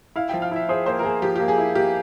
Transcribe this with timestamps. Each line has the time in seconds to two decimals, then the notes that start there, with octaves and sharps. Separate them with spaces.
0.16 E4 F5
0.29 F3 G5
0.42 F5
0.52 E4 E5
0.69 G#4 C5
0.86 A#3 C5
0.99 A#4
1.04 A#3 G#4
1.22 F3 G4
1.36 A#3 G4
1.48 G#4
1.58 E4
1.75 A#3 G4